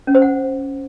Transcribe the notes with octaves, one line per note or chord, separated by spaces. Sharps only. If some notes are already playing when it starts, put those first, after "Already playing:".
C#4
C5
F#5